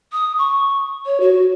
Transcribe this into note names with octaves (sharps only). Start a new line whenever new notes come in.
D#6
C#6
C#5
F#4